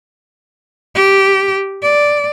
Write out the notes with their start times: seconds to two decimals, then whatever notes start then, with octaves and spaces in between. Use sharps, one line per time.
0.95 G4
1.83 D5